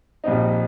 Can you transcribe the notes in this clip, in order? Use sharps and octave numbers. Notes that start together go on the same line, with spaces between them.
A#1 A#2 G3 C4 D#4